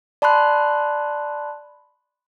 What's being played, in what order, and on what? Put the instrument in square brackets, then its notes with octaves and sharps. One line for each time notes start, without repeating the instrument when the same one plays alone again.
[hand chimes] D5 A5 B5 C6 F#6